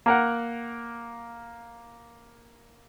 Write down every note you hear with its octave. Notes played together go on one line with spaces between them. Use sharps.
A#3 A#4 F#5